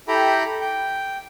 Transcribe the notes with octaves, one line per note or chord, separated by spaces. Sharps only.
E4 G4 A4 G5 A#5 B5
G5